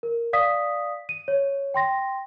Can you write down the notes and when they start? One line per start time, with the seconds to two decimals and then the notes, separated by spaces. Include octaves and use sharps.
0.03 A#4
0.33 D5 F5 D#6 B6
1.09 D#7
1.28 C#5
1.74 G5 C6 A#6